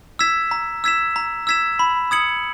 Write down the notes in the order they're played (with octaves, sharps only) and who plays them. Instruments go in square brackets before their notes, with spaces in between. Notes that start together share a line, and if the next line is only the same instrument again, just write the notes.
[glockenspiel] E6 G#6 B6 E7
A#5
E6 G#6 B6 E7
A#5
E6 G#6 B6 E7
B5
D#6 G#6 C#7 F#7